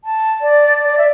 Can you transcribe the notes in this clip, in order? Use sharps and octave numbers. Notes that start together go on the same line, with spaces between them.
A5
D5
D5
E5